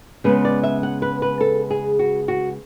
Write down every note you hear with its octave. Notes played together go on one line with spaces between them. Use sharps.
C#3 G#3 B3 B4
D5
E5
F#5
B4
B4
A4
G#4
F#4
F#4